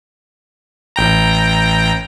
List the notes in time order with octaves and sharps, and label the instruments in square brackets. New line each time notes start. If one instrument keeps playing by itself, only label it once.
[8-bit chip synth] A1 G5 A#5